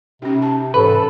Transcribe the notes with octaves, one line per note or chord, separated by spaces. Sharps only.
C3 C#4 D#4
A5
G#2 E3 A4 B4